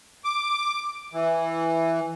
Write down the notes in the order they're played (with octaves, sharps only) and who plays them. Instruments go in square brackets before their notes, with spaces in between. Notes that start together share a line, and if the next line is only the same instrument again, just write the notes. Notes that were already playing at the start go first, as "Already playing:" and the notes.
[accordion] D6
E3